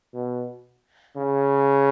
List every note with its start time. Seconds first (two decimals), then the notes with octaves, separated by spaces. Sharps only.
0.14 B2
1.17 C#3